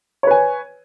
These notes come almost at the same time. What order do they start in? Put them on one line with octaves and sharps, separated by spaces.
C#5 B4 G#5